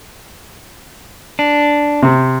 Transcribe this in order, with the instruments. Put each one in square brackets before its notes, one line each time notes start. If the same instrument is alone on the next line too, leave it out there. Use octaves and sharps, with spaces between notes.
[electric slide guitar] D4
[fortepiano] C3